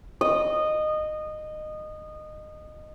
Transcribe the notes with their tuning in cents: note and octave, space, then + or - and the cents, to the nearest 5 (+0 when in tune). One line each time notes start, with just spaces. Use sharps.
D#5 -20